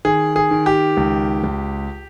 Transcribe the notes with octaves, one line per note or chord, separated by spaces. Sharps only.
D#3 G#4
G#4
D#3
G4
C#2
C#2